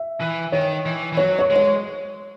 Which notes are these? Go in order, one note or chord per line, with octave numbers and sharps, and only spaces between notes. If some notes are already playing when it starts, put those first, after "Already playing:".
Already playing: E5
E3
D#3 C#5
E3
E3
F#3 C#5
C#5
G#3
C#5